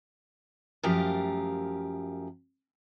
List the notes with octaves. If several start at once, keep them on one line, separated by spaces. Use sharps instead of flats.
F#2 F3 A3 G4 A#4 F5